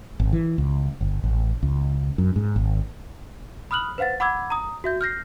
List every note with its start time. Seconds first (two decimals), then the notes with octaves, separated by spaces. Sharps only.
0.20 G#1
0.33 E3
0.58 C#2
1.01 G1
1.24 A1
1.63 C#2
2.18 F#2
2.36 G#2
2.56 G#1
3.71 B5 D#6 F6 F#6 F#7
3.98 B4 C5 F5 F#5 A6
4.20 F#5 B5 D6 E6 G#6
4.50 A#5 D#6
4.84 F#4 E5 G6
5.01 F6 G6 A#6 C7